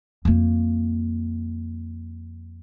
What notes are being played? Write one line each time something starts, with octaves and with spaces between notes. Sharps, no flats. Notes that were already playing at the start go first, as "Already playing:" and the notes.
F2 A#3